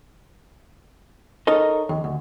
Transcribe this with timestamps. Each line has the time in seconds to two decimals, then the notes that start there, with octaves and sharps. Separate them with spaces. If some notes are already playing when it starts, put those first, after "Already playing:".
1.47 D#4 A4 A#4 C#5 D#5
1.89 D#2
2.04 D2